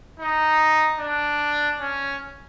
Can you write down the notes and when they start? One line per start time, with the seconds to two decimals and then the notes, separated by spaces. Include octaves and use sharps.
0.20 D#4
1.00 D4
1.81 C#4